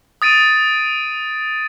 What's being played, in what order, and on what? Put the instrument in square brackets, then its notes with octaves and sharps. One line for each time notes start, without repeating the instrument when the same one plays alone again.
[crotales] D#6 A6 D7 D#7